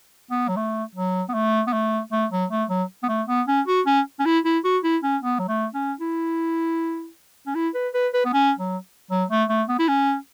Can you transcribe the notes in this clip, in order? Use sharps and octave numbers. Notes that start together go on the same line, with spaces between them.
B3
F#3
A3
F#3
B3
A3
B3
A3
A3
F#3
A3
F#3
B3
A3
B3
C#4
F#4
C#4
C#4
E4
E4
F#4
E4
C#4
B3
F#3
A3
C#4
E4
C#4
E4
B4
B4
B4
B3
C#4
F#3
F#3
A3
A3
B3
E4
C#4